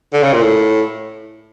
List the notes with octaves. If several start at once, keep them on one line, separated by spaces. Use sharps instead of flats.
D3
C#3
A#2
A2